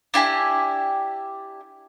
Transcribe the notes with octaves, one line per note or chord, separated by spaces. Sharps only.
D4 E4 G4 G#5